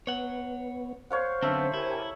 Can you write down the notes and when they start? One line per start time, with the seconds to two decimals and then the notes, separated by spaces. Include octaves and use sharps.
0.07 B3 C#5 F#5
1.10 C5 C#5 F5 F#5
1.42 F#2 D3 B3 C4 A4 E5
1.74 E4 G4 A#4 G#5